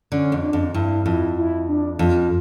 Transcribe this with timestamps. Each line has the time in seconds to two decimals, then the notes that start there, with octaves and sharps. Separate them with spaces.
0.12 D3 C#4
0.32 F2
0.43 D4
0.53 F2
0.74 G2 E4
1.05 F2 E4
1.37 E4
1.68 D4
1.99 F2 F4